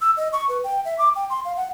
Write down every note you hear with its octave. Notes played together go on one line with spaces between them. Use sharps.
E6
D#5
C#6
B4
G5
E5
D6
G5
C6
F5
F#5